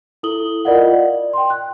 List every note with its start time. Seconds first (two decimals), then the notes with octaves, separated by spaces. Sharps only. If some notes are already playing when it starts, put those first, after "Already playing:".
0.23 E4 A4 D#6 F#7 G7
0.65 F4 A#4 D5 D#5 F5 F#5
0.91 D5
1.33 G5 C6
1.50 F#6